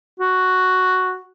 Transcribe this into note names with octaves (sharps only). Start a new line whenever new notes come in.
F#4